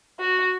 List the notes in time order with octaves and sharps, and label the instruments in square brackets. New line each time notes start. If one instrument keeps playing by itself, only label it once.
[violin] F#4